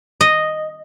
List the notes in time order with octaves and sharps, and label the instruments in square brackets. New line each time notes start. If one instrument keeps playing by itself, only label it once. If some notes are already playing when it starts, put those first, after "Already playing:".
[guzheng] D#5